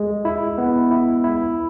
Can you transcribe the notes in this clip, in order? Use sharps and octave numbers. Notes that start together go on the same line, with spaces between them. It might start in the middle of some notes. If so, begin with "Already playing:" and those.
Already playing: G#3
E4
B3
E4
E4